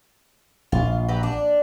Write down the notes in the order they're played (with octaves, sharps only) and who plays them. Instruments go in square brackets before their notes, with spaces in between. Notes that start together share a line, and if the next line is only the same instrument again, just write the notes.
[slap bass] A#1 [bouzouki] F4
[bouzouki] F#3 G4 B4
D4